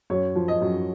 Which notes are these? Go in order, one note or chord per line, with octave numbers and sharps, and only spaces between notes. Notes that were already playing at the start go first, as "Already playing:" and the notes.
F#2 C#5
F3
D#5
F#2